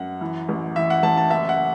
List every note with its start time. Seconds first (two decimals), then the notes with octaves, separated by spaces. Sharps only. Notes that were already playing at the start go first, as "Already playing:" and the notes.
Already playing: F#2 F#5
0.21 E3
0.49 A1
0.76 E3 E5
0.90 F#5
1.03 A1 A5
1.17 A5
1.30 F#1 E5
1.49 F#5